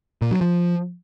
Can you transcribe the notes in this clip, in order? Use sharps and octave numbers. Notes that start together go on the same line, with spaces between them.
A#2
F#3
F3